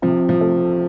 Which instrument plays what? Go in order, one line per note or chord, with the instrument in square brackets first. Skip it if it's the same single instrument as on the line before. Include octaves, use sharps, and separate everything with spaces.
[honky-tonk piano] C3 [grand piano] F3
[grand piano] F3
[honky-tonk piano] A3